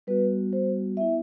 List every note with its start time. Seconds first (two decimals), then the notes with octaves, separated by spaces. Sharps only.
0.07 G3 B3 F#4 B4
0.53 C5
0.97 B3 E4 E5